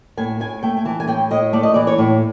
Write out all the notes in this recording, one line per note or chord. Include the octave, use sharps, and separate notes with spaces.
A2 G#5
A2 G#5
A3 G5
G#5
E3 A5
G#5
A2 G5
A2 D#5
A3 D5
D#5
E3 D5
C#5
A2